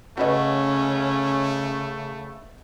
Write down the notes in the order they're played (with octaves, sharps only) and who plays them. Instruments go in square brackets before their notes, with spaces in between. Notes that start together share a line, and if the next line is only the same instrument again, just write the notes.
[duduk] C#3 [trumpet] A3 [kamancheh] C#4 [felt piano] F#4 B4 D#5